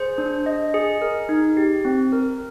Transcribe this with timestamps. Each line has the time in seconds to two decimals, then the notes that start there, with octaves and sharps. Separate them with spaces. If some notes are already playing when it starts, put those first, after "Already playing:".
Already playing: G#4 C5
0.18 D4
0.46 D#5
0.74 G#4
1.02 A#4
1.29 D#4
1.57 G4
1.85 C4
2.12 A#4